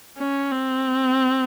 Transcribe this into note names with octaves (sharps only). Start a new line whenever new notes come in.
C#4
C4